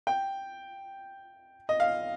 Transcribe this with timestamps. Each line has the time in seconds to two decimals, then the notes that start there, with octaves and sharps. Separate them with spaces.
0.07 G5
1.69 D#5
1.80 F5